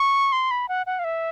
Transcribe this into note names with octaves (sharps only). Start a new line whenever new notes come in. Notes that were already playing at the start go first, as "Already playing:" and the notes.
Already playing: C#6
C6
B5
F#5
F#5
F5
E5